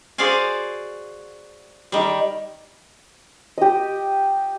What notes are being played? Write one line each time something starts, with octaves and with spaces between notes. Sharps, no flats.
F#4 G#4 C5 D5 F5 G#5
D#3 G3
G4 D#5